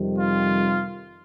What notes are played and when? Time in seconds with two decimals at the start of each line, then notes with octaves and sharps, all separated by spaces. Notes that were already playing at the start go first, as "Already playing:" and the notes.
Already playing: F2 C3 D#3 G3
0.18 F4